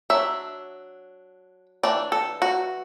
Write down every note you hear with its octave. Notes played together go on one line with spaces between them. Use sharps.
F#3 D4 E5
E3 A3 D4 D5
A4
F#4